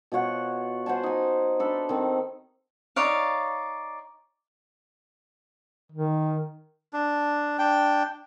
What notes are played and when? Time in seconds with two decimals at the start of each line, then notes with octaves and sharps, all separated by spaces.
0.12 B2 F4 C#5 F#5
0.86 C5 F#5 G#5 A5
1.03 D#4 G#5
1.59 D4 A4 B4
1.89 D#3 C4
2.96 D#4 C#5 D5 F5
5.92 D#3
6.93 D4
7.59 D4 G5